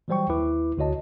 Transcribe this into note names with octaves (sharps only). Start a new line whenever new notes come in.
E3 F#3 G3 C5 G5 C#6
D#2 E4 B4 D6
D2 D3 F#4 C#5 D#5 A5